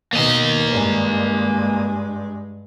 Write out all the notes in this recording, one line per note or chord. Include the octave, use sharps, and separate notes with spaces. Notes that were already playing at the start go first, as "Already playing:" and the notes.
B2 D#3 A#3 D#5
G2 G#3